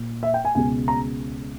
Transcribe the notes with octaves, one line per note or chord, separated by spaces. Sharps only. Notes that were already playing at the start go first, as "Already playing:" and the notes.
Already playing: A#2
E5
G5
G#5
C#2 B2 G#3 G#5
A#5